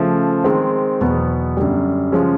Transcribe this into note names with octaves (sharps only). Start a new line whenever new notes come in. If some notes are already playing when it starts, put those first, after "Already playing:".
Already playing: C#3 F3 A3
D#3 G#3 C4
E2 B2 F#3 B3
F#2 D3 G3
C#3 F3 G#3 C#4